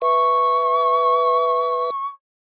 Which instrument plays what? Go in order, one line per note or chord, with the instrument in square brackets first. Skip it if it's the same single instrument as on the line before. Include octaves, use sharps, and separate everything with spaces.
[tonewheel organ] B4 E5 [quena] C#6